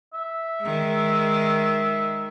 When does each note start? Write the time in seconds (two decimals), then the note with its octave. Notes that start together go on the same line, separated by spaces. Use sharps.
0.14 E5
0.62 D#3 G#3